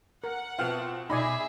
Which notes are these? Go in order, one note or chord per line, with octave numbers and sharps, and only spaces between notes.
A#4 F#5
B2 C4 F4 B4 E5 F5 A5
B2 D#4 G#4 D5 E5 G#5 B5 A#6